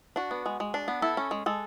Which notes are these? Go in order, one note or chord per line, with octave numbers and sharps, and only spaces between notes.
D4 F#4
B3
G#3
G#3
D4
B3
E4 A4
C#4
G#3
G#3 A4